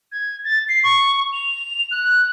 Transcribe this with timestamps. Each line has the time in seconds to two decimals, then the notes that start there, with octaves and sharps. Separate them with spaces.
0.12 G#6
0.44 A6
0.69 C7
0.84 C#6
1.33 F7
1.91 F#6